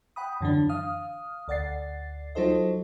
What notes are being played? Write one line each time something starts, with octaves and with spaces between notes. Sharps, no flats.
F#5 G5 B5 D#6
F#2 D3 E3 D4
F5 D#6 F6
D2 D5 F#5 A6 C7
F#3 D#4 F4 A4 C5 D#5